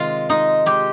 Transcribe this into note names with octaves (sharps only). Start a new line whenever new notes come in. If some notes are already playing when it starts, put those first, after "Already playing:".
Already playing: C3 D#3 G#3 F4
G#3 D#4
G#3 G4